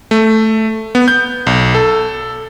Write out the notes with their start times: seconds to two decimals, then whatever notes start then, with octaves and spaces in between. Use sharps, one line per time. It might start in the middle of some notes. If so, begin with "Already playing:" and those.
0.11 A3
0.95 B3
1.08 G6
1.47 B1
1.75 A4